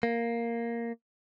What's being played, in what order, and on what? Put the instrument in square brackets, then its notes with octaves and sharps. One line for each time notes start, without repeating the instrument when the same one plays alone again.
[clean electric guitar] A#3